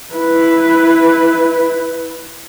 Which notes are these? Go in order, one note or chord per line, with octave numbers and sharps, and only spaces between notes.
E4 B4